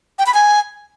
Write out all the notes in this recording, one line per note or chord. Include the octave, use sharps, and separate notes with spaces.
G5
B5
G#5